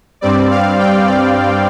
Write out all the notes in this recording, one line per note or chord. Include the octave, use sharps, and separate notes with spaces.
G2 G3 C4 D5
F5
G5
D5